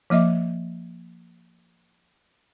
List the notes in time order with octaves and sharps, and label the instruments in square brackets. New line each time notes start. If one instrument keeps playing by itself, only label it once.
[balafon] F3 A#3 D#5 E5 D6